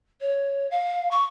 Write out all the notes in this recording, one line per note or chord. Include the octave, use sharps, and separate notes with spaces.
C#5
F5
C#6